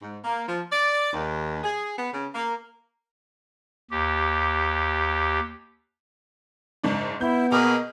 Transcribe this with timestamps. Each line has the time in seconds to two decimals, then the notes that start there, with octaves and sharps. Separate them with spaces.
0.02 G#2
0.24 A#3
0.47 F3
0.71 D5
1.13 D#2
1.63 G#4
1.98 B3
2.14 C#3
2.34 A#3
3.91 D#2 G4
6.83 F#1 G#2 D4
7.21 B3 E4 G6
7.52 B2 A#3 G#4 B4 F6